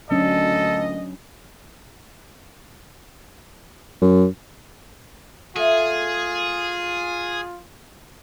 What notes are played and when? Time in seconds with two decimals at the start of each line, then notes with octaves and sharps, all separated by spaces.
0.11 D2 A#2 F#3 C#4 D4 A4 D#5
4.02 F#2
5.56 A3 F4 G#4